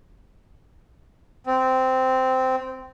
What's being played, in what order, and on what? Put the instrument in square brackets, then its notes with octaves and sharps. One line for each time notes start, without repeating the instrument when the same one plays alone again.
[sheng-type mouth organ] C4